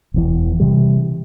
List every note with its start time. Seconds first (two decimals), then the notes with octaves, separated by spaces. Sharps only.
0.14 E1 E2 E3
0.60 C3 E3 G3